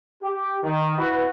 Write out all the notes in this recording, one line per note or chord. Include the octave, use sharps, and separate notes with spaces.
G4
D#3
E4 F#4 B4